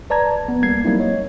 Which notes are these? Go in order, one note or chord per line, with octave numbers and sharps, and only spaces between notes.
B4 D5 A5 A#5 G#6
A#1 B3
D2 G3 A#3 G#6 C7
F#3 G3 A#3 C4 D#4 E4
C#5 D#5